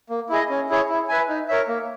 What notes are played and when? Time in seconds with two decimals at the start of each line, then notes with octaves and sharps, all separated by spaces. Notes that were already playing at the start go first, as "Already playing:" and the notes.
0.10 A#3
0.30 E4 G#4 D#5
0.50 C#4
0.69 E4 G#4 C#5
0.89 E4
1.09 B4 E5 G#5
1.29 D#4
1.48 A#4 C#5 E5
1.68 A#3